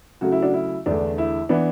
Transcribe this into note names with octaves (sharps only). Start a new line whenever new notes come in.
C#3 F#3 A3 F#4
E4
D4 F#4
E4
E2 D3 A3 D4
E4
E3 B3 D4